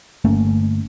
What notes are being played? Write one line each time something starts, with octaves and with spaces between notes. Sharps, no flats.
G1 A3 A#3 C#4